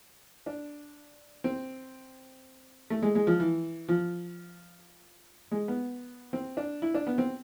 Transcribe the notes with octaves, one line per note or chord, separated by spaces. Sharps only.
D4
C4
A3
G#3
G#3
F3
E3
F3
G#3
B3
C4
D4
E4
D4
B3
C4